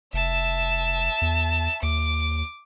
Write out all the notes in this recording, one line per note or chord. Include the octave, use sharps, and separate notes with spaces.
F1 E5 A5
E2
D#2 D6